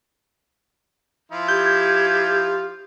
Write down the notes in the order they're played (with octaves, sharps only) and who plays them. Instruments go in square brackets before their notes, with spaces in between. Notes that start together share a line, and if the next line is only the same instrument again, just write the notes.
[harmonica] F3 E4 F4
[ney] G4 [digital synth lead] G6 [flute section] G#6